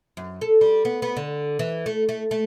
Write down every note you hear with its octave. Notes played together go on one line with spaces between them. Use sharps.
F#2
A4
G3
B3
B3
D3
E3
A3
A3
A3